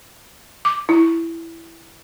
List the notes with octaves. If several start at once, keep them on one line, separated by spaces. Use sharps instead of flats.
D6
E4